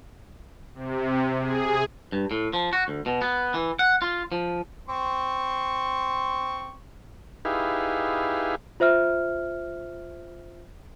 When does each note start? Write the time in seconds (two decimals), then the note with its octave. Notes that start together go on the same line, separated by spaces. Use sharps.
0.75 C3
1.40 G#4
2.12 G2
2.31 A2
2.53 F3
2.73 F#4
2.88 D2
3.06 B2
3.22 B3
3.54 E3
3.79 F#5
4.02 F4
4.32 F3
4.89 C4 C6 C#6
7.45 D#4 E4 G4 G#4 B4 F5
8.80 F4 C5 E5 F6